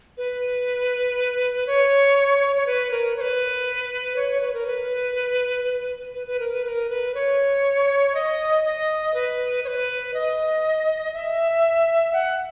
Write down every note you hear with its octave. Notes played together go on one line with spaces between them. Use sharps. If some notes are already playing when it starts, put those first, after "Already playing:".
B4
C#5
C#5
B4
A#4
C#5
B4
C#5
C#5
B4
A#4
B4
B4
B4
A#4
B4
B4
A#4
B4
C#5
D#5
D#5
B4
C#5
B4
D#5
E5
F#5